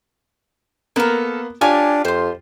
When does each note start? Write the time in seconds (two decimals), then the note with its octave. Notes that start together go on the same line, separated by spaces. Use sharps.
0.96 A#3 B3 A4 A#4
1.61 D4 F4 G4 C#5 G#5 A5
2.05 F2 C5 C6